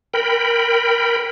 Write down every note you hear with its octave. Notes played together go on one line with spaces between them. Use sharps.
A#4 G5 B5